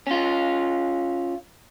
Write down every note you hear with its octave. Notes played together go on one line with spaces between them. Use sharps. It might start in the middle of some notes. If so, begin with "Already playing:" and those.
C#4 F4